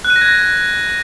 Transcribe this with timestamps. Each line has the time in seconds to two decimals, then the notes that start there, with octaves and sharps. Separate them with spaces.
0.05 F#6
0.10 D#7
0.16 A#6
0.21 G#6